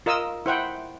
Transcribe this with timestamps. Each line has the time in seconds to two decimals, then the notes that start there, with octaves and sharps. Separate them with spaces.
0.06 F4 A#4 D#5 D#6 E6
0.46 E4 C5 F#5 G5